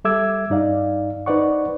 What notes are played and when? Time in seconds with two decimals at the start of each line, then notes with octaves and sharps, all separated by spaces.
0.04 G3 A4 E5 D6 E6 G#6
0.50 G2 D#4 D5 F5
1.26 D#4 B4 C5 D5 F#5 C#6